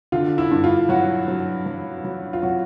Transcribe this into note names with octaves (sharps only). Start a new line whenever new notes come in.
D3 F4
E4
G2
F4
F#3 F#4
F#3
F#3
F#3
F4
F#3 F#4